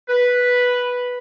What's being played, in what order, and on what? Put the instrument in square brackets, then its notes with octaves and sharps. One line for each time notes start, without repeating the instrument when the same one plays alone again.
[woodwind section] B4